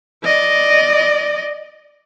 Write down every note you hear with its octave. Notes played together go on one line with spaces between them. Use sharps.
D5 D#5